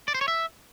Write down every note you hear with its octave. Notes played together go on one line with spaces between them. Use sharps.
D5
C5
C#5
E5